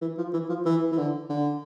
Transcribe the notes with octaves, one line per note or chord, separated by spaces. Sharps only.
E3
F3
E3
F3
E3
E3
D3
D3